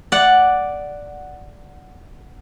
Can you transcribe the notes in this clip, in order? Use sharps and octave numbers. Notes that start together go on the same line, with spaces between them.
D5 F#5